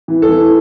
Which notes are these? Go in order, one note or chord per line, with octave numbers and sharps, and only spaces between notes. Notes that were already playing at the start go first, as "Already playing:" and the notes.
E3
A4
E3